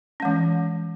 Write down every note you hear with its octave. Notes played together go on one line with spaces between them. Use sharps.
E3 G#3 C#4